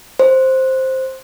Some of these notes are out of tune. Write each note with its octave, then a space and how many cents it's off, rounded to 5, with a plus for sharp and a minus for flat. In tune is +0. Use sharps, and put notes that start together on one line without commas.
C5 +5